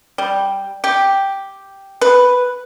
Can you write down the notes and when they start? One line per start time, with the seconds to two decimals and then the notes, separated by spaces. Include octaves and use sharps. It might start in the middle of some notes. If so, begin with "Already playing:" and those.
0.18 G3
0.84 G4
2.01 B4